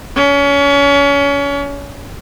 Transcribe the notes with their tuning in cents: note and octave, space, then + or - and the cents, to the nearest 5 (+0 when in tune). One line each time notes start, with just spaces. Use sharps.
C#4 +30